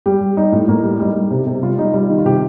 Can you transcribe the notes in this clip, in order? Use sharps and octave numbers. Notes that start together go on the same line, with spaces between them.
G3 G4
G3
G3 D#4
A2
A2 A#3
G3
G3 D#4
G3
C3
C3
G3 F4
G3 D#4
G3 F4
D#3
F4
C3 G4